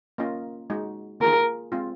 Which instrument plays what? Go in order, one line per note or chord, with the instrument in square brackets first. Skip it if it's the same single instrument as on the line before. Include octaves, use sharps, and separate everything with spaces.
[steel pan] A#3 C#4 F4 A#4 D#5
G#3 D#4 F#4
[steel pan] A#3 F4 G#4 [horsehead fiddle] A#4
[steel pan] G#3 C4 F4